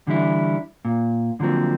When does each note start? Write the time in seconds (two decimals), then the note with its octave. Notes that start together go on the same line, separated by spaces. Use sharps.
0.07 D3 E3 G3 D4 E4
0.85 A#2
1.40 D3 F3 F#3 A#3 C4